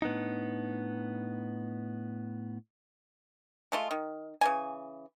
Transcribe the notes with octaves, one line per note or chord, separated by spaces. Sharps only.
A2 B3 D4 D#4
G#3 A3 F4
D#3
C#3 E3 G#5